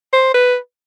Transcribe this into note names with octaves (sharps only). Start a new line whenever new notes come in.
C5
B4